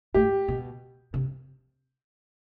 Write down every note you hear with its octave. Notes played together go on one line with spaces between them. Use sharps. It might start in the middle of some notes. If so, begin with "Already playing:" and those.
A2 G4
B2
C3